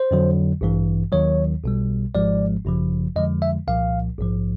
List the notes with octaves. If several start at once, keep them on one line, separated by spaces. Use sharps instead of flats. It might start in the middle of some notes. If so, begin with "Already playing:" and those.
Already playing: C5
F2 D3 F#3
A1 G2 E3
D#2 D#3 F#3 C#5
B1 B2 G3
G#1 G#2 F3 G#3 D5
G#1 F#2 C#3 F3
F2 D3 F3 G#3 D#5
E5
C2 A#2 F3 F5
A#1 G#2 F3